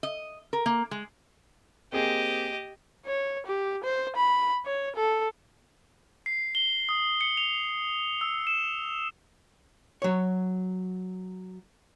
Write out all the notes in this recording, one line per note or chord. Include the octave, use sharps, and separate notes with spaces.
D#5
A#4
A#3
G#3
A#3 C4 G4 G#4 D#5
C#5
G4
C5
B5
C#5
A4
C7
G7
D#6
C#7
F7
E6
E7
F#3 C#5